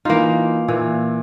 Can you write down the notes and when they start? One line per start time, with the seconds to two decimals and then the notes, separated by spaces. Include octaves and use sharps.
0.05 E3 A#3 D#4 F4
0.68 A#2 E3